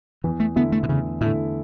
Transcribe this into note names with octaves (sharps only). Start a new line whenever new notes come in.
E2 E3
A3
D3 A3 B3 E4
A3
B2
E2 C#3
A2 D3 A3 E4